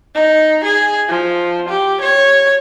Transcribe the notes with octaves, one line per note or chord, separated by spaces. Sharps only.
D#4
G#4
F3
G4
C#5